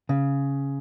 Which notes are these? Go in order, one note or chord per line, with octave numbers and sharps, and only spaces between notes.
C#3